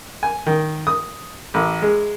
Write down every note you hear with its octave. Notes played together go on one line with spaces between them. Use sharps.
G#5
D#3
D#6
A1
G#3